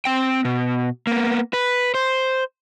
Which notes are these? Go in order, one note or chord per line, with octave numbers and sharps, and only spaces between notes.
C4 G5
B2
A#3 B3
B4
C5